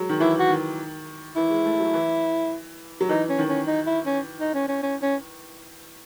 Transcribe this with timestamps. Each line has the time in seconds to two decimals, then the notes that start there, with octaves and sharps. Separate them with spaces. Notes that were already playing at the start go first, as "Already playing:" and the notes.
Already playing: F#3 G#3
0.09 D#3
0.20 E3 E4
0.39 F#4
0.49 D#3
1.36 E3 E4
1.50 G#3
1.65 A3
1.80 F#3
1.94 E3
3.01 F#3
3.09 E3 D#4
3.29 C#4
3.38 D#3
3.48 C#4
3.67 D#4
3.86 E4
4.06 C#4
4.40 D#4
4.54 C#4
4.68 C#4
4.83 C#4
5.02 C#4